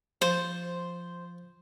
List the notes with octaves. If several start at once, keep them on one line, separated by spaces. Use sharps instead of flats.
F3 C5